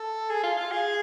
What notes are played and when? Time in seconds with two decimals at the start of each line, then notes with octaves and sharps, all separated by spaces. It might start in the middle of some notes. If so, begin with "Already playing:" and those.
Already playing: A4
0.29 G#4
0.44 F4
0.57 F4
0.72 G#4